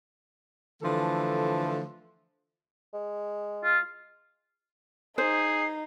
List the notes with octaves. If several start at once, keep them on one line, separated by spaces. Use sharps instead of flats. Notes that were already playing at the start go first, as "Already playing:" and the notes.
D3 E3 F3 A3 A4
G#3
F4
D#4 G#4 C5 C7